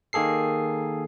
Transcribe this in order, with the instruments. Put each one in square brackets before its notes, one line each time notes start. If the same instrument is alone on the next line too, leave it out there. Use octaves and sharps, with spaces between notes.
[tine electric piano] D#3 A#3 G#4 A4 C7